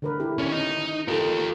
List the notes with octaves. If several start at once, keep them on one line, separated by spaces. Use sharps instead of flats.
D3 A#4 B4
E4 G4
D#3 C#4 D4
D#4
F4 G4 A4 A#4